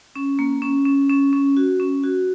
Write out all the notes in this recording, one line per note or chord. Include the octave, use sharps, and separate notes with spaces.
C#4
A#3
C#4
C#4
C#4
C#4
F#4
C#4
F#4